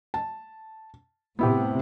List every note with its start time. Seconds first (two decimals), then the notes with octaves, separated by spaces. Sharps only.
0.14 A5
1.39 A2 C3 B3 E4 G4